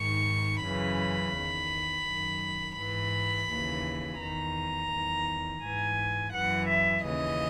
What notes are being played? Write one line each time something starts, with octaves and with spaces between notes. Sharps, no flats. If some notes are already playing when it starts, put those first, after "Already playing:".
Already playing: G#2 D#3 C#6
F#2 C#3 E3 B5
E2 D#3
F#2 D#3
G#2 E3 B5
D#2 C#3 E3
E2 D#3 A#5
E2 D#3
G#2 E3 G#5
F#2 E3 F#5
E5
D#2 C#3 E3 D#5